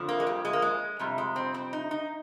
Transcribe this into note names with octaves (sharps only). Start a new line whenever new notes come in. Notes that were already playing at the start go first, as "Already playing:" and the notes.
Already playing: F2 D3 F3
A#3
G#3
G3
G#3
A#3
G#3
F2 C3 G3
G#3
C4
C4
D#4
D#4